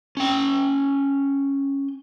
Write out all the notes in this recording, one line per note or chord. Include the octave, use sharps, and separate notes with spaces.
C#4 G5